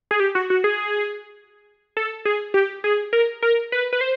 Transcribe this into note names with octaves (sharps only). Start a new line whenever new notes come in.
G#4
G4
F#4
F#4
G#4
A4
G#4
G4
G#4
A#4
A#4
B4
B4
C5